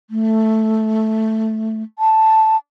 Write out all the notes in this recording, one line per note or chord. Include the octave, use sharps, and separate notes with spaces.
A3
A5